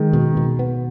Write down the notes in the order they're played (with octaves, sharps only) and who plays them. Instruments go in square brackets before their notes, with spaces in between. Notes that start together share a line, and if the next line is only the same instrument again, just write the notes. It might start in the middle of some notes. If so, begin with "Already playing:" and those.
Already playing: [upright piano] D#3 [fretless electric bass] G#3
[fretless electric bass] B2
B2
B3